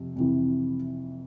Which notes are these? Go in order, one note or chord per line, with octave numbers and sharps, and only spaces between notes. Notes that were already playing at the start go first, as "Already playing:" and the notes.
Already playing: F2 C3
F2 C3 E3